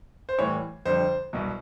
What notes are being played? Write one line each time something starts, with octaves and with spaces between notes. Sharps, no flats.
C5
A2 E3 G3 C#5
F2 D3 G3 C5
C2 B2 F#3